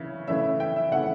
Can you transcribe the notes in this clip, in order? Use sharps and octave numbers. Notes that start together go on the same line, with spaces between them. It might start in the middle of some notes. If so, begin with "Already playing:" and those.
Already playing: C#3 E3 C#4
C#3 E3 A3 C#4 E5
G5
E5
C#3 E3 A3 C#4 F#5